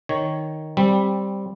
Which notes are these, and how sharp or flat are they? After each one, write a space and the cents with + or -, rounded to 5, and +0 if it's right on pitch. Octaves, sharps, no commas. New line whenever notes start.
D#3 +0 C#5 +0
G3 +0 C4 +10